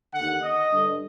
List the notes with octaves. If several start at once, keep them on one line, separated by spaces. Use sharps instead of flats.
D#2 D3 F#5
D#5
G2 D3